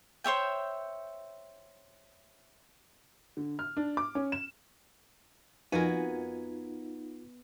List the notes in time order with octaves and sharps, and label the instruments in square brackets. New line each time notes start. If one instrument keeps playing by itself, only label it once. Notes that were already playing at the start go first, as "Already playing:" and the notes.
[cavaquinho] C5 C#5 E5 G5
[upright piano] D3
F6
D4
D6
C#4
E7
[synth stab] F2 G#5 [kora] B3 F#4 A#4 [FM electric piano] D#4 [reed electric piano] F4